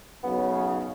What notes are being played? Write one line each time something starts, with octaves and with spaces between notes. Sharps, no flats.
B1 C#3 B3